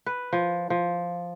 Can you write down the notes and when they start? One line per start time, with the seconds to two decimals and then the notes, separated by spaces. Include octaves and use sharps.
0.06 B4
0.33 F3
0.70 F3